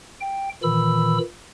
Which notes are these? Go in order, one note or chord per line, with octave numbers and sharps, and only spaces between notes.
G5
A#2 D#3 E3 B5 E6